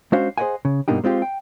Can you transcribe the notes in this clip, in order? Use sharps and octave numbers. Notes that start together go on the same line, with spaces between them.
G#3 C#4 D4 F#4 C5 F5
G#4 C5 D5 D#5 F#5 G#5
C#3
G2 B2 A#3 D4 D#4 G4
G#3 C4 F4 G4
G5